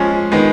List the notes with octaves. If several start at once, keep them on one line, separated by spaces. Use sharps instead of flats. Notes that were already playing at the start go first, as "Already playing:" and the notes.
Already playing: F3 G#3 C#4
D#3 G#3 B3